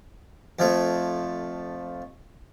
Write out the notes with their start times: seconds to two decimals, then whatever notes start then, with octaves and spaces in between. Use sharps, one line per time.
0.59 F2 F3 A3